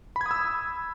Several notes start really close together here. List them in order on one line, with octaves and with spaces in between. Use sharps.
B5 G#6 D#6 E6